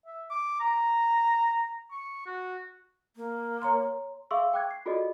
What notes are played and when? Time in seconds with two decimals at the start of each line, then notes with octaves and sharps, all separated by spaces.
0.06 E5
0.30 D6
0.60 A#5
1.91 C#6
2.26 F#4
3.16 A#3
3.62 C#5 A#5 C6
4.31 G#4 E5 F5 C6 C#6 E6
4.53 G5 D6 F#6 G#6
4.71 C7
4.86 F4 F#4 G#4 A4 D5 D#5